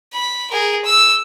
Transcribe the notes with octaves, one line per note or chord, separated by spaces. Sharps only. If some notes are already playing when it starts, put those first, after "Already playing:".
B5
G#4 A#4
E6